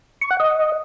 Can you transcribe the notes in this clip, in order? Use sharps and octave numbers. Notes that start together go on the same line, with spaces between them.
C#6
F#5
D#5